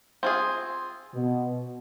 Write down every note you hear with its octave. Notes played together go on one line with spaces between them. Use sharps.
C4 F4 G#4
B2